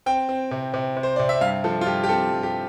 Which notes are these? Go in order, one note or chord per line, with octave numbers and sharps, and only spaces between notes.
C4 G5
C4
C3
C3
C3
C5
C3 D5
E5
G2 F5
F3 A4
F4
G2 G4
G4
C4 A4
G2
G4